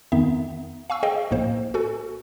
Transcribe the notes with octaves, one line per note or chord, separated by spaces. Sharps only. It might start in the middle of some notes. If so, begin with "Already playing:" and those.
F2 D#3 B3 D#4 E5
F5 G#5 C#6 E6
G#4 C5 D#5 F5 G5
A#1 A2 A#3 C5
F#4 A4 G#5